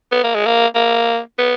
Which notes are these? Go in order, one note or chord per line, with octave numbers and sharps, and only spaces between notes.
B3
A#3
G#3
A#3
A#3
B3